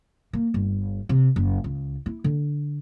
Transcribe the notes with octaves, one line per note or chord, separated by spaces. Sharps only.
A#3
G1
C3
F#1
C#2
E4
D3